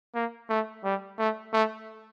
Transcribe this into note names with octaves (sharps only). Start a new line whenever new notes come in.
A#3
A3
G3
A3
A3